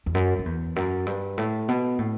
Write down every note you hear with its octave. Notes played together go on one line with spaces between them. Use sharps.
E2
F#2
F#2
E2
F#2
G2
A2
B2
A2